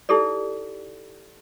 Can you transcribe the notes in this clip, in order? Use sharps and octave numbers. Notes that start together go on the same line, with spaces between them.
D#4 E4 G4 A4 D5